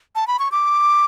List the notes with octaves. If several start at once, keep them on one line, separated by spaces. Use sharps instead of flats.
A5
B5
C#6
D6